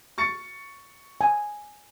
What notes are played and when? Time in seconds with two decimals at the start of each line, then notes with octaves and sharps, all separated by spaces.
0.18 C#6 A6 C#7
1.21 G#5